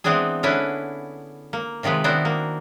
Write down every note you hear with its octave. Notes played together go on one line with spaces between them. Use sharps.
E3 G#3 B3 C4 D4 G#4
D3 C#4 D4 E4 B4
A#3
C3 D#3 F3 G#3 B4
D#3 B3 D4 E4 F#4 C5
A#3